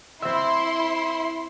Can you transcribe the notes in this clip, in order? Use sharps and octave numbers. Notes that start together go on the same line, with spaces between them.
C4 E4 E5 C6